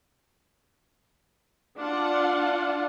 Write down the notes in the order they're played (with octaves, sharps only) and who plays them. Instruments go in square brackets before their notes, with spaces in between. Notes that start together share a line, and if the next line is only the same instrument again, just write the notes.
[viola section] D4 F4 F#5